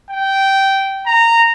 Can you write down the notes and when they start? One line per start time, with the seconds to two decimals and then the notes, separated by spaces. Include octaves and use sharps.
0.11 G5
1.07 A#5